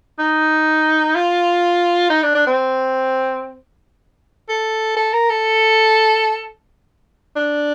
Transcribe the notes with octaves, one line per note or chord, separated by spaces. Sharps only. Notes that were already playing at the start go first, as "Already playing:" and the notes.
D#4
F4
D#4
D4
D4
C4
A4
A4
A#4
A4
D4